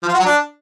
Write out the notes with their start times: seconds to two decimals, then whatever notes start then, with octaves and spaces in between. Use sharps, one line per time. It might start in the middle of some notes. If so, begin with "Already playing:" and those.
0.03 F3
0.08 F4
0.14 F#4
0.19 F#3
0.25 D4